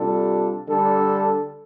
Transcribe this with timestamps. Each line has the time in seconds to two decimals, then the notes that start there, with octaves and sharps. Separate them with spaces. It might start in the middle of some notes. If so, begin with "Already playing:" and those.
Already playing: C3 G3 D4 F4 A4
0.67 D3 G3 D4 A4